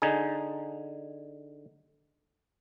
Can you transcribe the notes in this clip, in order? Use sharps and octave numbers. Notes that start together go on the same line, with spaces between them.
D3 D#4 G#4